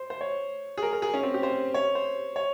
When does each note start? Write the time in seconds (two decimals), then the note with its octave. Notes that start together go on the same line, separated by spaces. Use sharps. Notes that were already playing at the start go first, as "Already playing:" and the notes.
Already playing: C5
0.10 C5
0.21 C#5
0.78 G#4
0.83 A#4
0.93 A#4
1.02 G#4
1.14 C#4
1.23 C4
1.34 G4
1.43 C5
1.74 C#5
1.95 C5
2.36 C#5